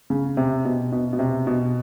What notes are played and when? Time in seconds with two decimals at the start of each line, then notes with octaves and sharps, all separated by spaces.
0.10 C#3
0.37 C3
0.65 B2
0.92 B2
1.13 B2
1.19 C3
1.47 B2